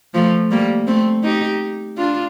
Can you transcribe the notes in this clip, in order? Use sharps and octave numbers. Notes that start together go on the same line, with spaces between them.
F3 A3
G3 A#3
A3 C4
D#4 G4
D4 F4